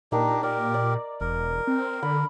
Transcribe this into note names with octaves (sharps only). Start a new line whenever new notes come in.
A#2 D4 D#4 G4 A#4
G4 A#4 D5
D5
E1 A#4
C4
D3 B5